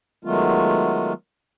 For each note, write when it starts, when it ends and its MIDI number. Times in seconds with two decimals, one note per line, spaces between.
0.24 1.13 51
0.24 1.13 54
0.24 1.13 56
0.24 1.13 57
0.24 1.13 59
0.24 1.13 65